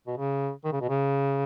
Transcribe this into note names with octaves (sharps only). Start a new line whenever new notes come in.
B2
C#3
D#3
C#3
B2
C#3